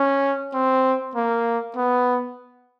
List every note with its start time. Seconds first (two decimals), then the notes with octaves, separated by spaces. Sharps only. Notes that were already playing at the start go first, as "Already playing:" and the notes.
Already playing: C#4
0.54 C4
1.16 A#3
1.76 B3